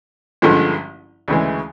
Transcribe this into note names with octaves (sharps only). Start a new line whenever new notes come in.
A1 G2 D3 F3 G#3
D2 C#3 E3 G#3